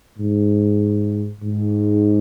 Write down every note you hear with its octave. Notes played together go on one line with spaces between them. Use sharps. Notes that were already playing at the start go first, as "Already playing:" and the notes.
G#2
G#2